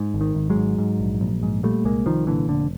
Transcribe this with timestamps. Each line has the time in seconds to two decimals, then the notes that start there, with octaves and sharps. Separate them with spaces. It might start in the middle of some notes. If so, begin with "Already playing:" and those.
Already playing: G#2
0.14 G#1
0.21 D#3
0.35 G#1
0.50 F#3 G#3
0.56 G#2
0.78 G#2
1.00 A#1
1.21 A#1
1.43 G#2
1.63 A#2 G3 A3
1.85 C2 G#3 A#3
2.06 C2 D#3 F3
2.27 A#2 D3 E3
2.48 F1 D3